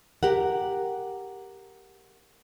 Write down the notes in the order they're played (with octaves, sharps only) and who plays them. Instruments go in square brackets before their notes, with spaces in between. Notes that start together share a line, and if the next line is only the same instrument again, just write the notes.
[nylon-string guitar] G4 A#4 F#5